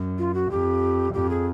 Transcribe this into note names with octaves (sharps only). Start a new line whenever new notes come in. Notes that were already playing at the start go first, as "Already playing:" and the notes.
Already playing: F#2
F4
F#4
F2 G4
F2 G4
G#4